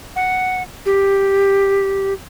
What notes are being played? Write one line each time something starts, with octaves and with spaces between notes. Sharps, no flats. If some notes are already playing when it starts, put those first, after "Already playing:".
F#5
G4